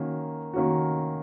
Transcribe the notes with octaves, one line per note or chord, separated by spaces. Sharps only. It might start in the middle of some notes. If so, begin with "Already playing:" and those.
Already playing: D#3 A#3 C#4 F#4
D#3 A#3 C#4 F#4